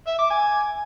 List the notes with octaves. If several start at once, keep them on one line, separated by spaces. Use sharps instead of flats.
E5
D6
G#5